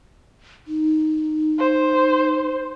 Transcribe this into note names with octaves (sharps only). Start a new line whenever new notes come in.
D#4
C5